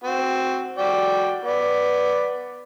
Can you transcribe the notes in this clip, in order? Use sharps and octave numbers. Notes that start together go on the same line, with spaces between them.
C4 F#4
F#4 D5 G5
B3 D5